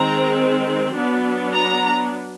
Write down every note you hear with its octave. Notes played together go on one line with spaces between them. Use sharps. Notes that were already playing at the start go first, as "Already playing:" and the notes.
Already playing: D#3 G#3 C4 A#5
F#3 B3 D4
A#5